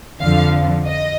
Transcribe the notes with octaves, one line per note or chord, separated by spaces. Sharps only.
F2 D3 F3 F5
D#5